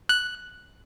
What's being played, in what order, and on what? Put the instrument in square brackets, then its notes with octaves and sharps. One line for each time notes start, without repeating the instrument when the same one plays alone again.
[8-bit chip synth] F#6